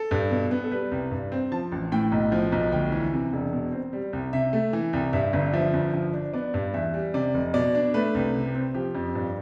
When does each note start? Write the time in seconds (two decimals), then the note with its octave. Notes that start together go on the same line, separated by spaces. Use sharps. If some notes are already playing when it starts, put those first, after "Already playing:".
Already playing: A4
0.11 G2
0.31 B2
0.51 B3
0.64 A4
0.71 G3 B4
0.91 C2
1.11 G2
1.32 C4
1.52 F3 A5
1.72 A1
1.92 A2 G5
2.12 B1
2.32 F3
2.52 B1
2.72 D2 G5
2.92 E3
3.13 C3
3.33 E1
3.53 B2
3.72 C4
3.93 G3
4.13 C2
4.33 C3 E5
4.53 A3
4.73 E3
4.93 C2
5.13 G2 E5
5.33 G1
5.53 F3 E5
5.74 G1
5.94 F3
6.14 D4
6.33 B3 D5
6.54 G2
6.74 E2 E5
6.94 G3
7.14 C3 D5
7.34 F1
7.54 B2 D5
7.75 D4
7.94 A3 B4
8.15 C2
8.34 C3
8.54 C4
8.74 F3 G4
8.95 F2
9.15 G2